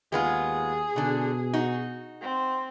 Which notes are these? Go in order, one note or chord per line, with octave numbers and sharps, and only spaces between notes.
D#2 G#3 B3 F4 G#4
B2 D3 D4
D#4 F#4
C4